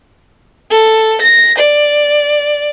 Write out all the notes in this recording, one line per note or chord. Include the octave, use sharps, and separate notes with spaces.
A4
A#6
D5